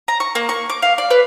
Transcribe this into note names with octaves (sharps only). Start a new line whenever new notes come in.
A#5
C#6
A#3
C#6
D6
F5
D5
B4